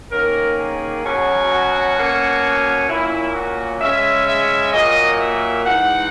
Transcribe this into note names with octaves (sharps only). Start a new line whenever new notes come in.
D#3 A#3 C#4 A#4
G#4
B2 F#3 C#4
F#4
B2 A#3 C#4
A#2 A#3 C#4 E4
F#4
C#3 G#3 C#4 E5
E5
A#2 F#3 A#3 D#5
E5
E3 G#3 D#4 F#5